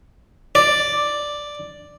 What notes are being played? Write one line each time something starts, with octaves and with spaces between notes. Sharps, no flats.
D5